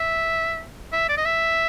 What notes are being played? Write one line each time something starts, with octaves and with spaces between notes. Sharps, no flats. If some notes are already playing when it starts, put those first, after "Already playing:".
Already playing: E5
E5
D5
D#5
E5